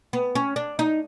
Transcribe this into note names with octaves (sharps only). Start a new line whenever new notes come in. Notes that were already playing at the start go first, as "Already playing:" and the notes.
B3
C#4
D4
D#4